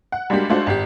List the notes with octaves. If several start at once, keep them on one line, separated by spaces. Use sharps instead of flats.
F#5
G3 G#3 A#3 D4 F#4 G4
G#3 A3 D4 F4 F#4 C5
G#1 G4